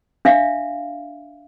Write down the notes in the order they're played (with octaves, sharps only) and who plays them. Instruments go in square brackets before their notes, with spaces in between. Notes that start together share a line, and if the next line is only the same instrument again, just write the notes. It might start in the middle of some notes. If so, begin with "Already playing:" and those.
[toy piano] D4 E5 F5